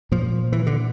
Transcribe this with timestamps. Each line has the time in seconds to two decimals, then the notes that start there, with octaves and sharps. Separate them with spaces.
0.12 A#2 F3
0.52 E3
0.67 D3